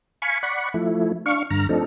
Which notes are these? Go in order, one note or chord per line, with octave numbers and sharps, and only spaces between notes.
F5 G#5 B5 C#6
D5 F#5 B5 C#6
F3 A3 E4
D4 F5 C#6
G2 D3 A#5 F6
F3 A3 C4 D4 D#4 A4